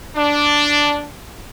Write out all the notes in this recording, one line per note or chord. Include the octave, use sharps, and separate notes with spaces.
D4